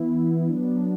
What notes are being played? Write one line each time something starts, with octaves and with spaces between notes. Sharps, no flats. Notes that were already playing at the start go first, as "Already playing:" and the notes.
Already playing: E3 B3 E4
F#3 B3 D4